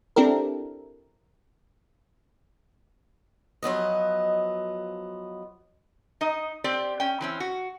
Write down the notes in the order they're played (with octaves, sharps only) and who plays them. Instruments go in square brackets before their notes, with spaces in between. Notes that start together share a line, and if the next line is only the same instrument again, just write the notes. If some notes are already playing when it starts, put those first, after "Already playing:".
[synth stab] C4 D4 E4 G4 A4 A#4
[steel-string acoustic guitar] F3 F#3 B3 D#5
[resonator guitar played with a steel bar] D#4 D#5
C4 G4 D5
C#4 G5
E3 C4 C#4
F#4